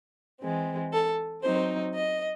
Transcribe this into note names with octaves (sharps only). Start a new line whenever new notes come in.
E3 G#3 C4
A4
F#3 C4 D#4 C5
D#5